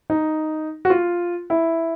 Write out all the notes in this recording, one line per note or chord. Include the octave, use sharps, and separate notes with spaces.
D#4
F#4
F4
E4